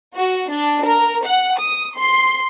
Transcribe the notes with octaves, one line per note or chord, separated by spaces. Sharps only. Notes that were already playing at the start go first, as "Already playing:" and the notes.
F#4
D4
A#4
F#5
D#6
C6